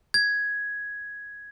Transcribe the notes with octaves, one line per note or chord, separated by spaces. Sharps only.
G#6